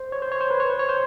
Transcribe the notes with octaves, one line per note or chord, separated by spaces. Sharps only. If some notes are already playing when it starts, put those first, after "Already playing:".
Already playing: C5
C#5
C5
C#5
C5
B4
C#5
C5
C#5
C5